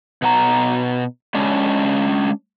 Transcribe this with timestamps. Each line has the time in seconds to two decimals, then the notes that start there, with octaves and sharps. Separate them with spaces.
0.22 B2 F#5 A#5
1.35 G#3 C#4 D4